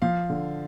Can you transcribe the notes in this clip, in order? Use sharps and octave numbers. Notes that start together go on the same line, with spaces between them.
F3 F5
D3